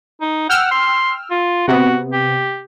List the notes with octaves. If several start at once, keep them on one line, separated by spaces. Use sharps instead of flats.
D#4
F#5 G5 E6 F6
C6
F4
C3 B3 F#4
G4